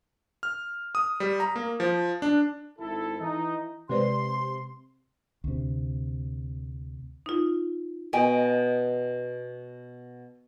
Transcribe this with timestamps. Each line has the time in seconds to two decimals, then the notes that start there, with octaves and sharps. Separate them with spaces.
0.43 F6
0.95 D#6
1.20 G3
1.40 A#5
1.56 A#3
1.80 F3
2.22 D4
2.79 G#1 E4 A4
3.20 E3 D#4
3.89 C3 G#3 B4 D5 C6
5.44 D2 C3
7.26 D#4 F4
8.13 B2 D#5 G5 G#5